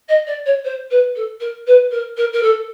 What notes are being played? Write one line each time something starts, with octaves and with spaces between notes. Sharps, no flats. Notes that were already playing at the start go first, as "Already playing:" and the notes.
D#5
D5
C#5
C5
B4
A4
A#4
B4
A#4
A#4
A#4
A4